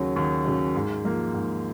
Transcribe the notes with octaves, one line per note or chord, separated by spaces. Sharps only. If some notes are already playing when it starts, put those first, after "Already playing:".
Already playing: D#2 C#3 F#3
D#2
C#3 F#3
G#2
F3 A#3
G#2